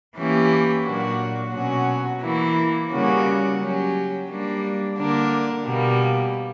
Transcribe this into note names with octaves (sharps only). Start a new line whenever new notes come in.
E3 A#3 C#4 E4 G4
A#2 F#3 A#3 D4 F#4
B2 F#3 C#4 F#4
E3 A#3 E4
C#3 G3 A#3 C#4 F#4
F#3 C#4 G4
G3 A#3 D4
D3 A#3 D4 A#4
B2 G3 A#3